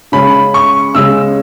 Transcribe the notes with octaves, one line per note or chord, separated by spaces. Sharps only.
C#3 G#3 C#4 B5
C#6
C#3 G#3 C#4 E6